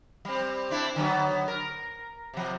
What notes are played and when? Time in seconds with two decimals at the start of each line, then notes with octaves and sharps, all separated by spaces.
0.25 G3 C4
0.70 C4 D4 E4
0.96 D3 F#3 B3
1.48 A#4
2.34 C3 F3